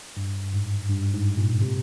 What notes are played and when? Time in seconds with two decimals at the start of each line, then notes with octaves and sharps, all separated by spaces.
0.17 G2
0.54 G#2
0.89 G2
1.13 G#2
1.37 A#2
1.61 C3